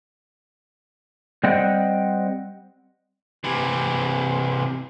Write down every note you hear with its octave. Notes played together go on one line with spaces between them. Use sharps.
G3 C4 C5 D#5 F#5 G5
C3 E3